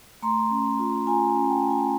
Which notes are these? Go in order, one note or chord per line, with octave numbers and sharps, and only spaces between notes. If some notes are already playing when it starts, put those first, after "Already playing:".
A3 A#5 C6
C#4
F4
F4 G#5 A#5
C#4
G5 A5
A3
G#5 A#5